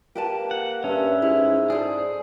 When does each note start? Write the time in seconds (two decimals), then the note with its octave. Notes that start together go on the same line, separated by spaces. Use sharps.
0.15 A#3 G4 B4 A5
0.51 F#5
0.84 G2 C#4 E5
1.22 G#2 E4
1.70 G#4 A4 C5 D5